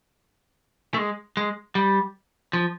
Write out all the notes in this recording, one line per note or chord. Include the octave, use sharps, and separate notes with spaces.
A3
G#3
G#3
G3
F3